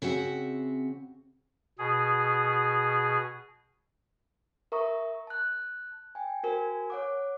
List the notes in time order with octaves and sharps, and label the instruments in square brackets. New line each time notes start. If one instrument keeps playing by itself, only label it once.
[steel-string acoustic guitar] C#3 C4 F#4 E5 F#5
[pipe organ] B2 G#4
[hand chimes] A#4 E5 A#5 C#6 D#6
A5 F#6
G5 G#5
F#4 A#4 C5 G#5
C#5 F#5 D6